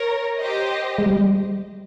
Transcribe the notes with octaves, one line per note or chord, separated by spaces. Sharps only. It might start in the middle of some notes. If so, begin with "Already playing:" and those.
Already playing: A#4 C#5
G4 C5 D#5
G#3
G3